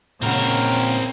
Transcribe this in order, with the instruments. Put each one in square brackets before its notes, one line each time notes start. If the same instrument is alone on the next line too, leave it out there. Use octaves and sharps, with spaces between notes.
[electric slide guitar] A#2 F#5 [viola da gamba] C#3 [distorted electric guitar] C4 A#4